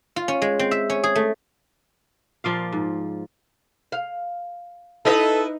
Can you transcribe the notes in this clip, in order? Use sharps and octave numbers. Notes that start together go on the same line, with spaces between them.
F4
C#4
G#3
C4
E5
C#4
G#4
A3
A#2 F3 D5 F5
G#2
F5
D#4 E4 A4 B4 D#5